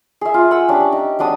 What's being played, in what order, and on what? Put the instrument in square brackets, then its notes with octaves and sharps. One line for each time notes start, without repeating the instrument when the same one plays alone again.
[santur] G#4 E5
F4
F#5 G#5 E6
C#4 D4 G4
D#4
F#3 G#3 D4 D#6